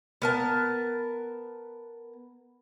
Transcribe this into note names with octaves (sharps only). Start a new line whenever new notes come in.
B3 A#4 A5